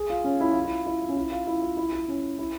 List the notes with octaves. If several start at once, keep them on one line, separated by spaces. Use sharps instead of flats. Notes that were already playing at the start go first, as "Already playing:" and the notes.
Already playing: G#4
F4
C#4
E4
F4
E4
E4
F4
C#4
E4
F4
E4
F4
E4
E4
C#4
E4